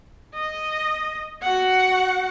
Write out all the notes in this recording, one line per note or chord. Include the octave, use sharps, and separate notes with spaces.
D#5
F#4 F#5